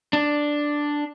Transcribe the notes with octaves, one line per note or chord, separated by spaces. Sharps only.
D4